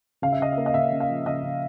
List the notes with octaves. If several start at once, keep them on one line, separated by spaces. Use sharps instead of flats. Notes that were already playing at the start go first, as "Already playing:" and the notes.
C#3 F5
E5
C#3 D#5
A#3 E5
D#5
C#3 E5
C#3
F5
F3
C#3 D#5
C#3